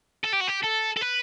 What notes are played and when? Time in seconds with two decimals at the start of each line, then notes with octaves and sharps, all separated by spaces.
0.24 A4
0.32 G4
0.40 F#4
0.47 G4
0.63 A4
0.97 A4
1.01 B4